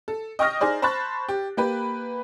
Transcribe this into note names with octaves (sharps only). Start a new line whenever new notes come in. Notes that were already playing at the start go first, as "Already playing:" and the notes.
A4
D#5 G5 C#6 D#6 F6 A#6
D#4 G#4 C5 D5
C5 A5 B5 C#6 F#6 A6
G4
A#3 G4 B4